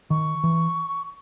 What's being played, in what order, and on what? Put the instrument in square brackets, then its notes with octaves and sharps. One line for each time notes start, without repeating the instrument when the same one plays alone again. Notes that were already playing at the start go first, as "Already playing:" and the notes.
[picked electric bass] D#3 [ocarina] C#6
[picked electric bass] E3